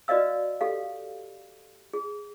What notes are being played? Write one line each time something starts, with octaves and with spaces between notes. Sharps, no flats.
F#4 B4 D5 D#5 F5 E6
G4 A4 F5
G#4